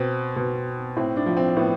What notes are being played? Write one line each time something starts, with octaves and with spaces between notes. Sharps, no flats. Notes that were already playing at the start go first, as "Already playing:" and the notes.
Already playing: B2 C4
B2
A2 C4
D4
F3
C4
A2 B3